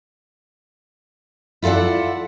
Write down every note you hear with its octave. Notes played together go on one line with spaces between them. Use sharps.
E4 F4 A4 D5 F#5